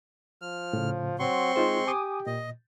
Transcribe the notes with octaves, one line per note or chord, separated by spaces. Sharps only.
F3 F6
A2 C#3
F#3 C4 C6 C#6
G#3 D#4 F4 C5
G4 G#5 D6 D#6
A#2 D#5